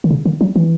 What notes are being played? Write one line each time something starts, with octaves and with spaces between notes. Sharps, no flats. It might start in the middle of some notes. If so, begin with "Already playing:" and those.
D#3
C#3
D#3
F#3
E3